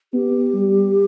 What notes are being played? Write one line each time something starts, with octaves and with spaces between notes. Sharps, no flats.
B3 G4
G3